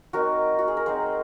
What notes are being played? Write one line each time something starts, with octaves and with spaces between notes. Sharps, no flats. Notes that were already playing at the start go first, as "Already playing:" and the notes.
F#3 C4 D#4 F#4 A#4
F#4
G#4
A#4
F#3 C4 D#4 G#4 C5